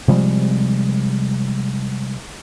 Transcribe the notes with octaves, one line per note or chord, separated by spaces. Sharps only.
C3 F3 G3 G#3